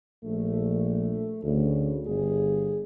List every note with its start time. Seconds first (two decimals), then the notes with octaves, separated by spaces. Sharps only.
0.24 A#1 A3
1.43 D2 C#3
2.07 G1 G#4